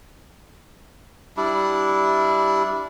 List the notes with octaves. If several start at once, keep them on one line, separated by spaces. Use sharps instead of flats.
G3 D4 E4